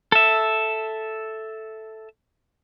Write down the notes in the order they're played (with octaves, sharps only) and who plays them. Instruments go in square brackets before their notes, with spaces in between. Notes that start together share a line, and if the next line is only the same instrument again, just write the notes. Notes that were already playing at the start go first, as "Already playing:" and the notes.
[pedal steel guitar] A4 E5